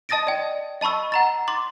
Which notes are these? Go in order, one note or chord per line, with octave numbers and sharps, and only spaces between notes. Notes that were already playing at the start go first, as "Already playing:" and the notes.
D#5 A5 D#6 A6 A#6 D7
D5 G5
D#5 A5 B5 C#6 E6
F#5 A#5 A6
C6 D6 A6